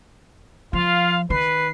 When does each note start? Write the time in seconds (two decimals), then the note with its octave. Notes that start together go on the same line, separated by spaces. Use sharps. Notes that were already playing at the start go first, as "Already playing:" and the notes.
0.73 F3 F4 F5
1.30 D#3 B4 C7